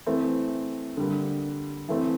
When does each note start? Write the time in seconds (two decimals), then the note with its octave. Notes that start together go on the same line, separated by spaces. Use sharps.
0.06 E3 A3 C4
0.97 D3 G3 A#3
1.89 E3 A3 C4